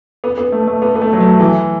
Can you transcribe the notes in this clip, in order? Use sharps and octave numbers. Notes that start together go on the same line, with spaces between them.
B3
B3
A3
A3
B3
B3
A3
F#3
A3
E3